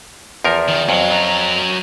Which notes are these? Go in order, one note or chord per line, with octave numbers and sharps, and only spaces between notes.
E2 F3 A#4
D#3
F2 F#3
F#3 A#4